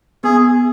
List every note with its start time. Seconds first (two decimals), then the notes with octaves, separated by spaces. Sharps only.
0.24 B3 G#4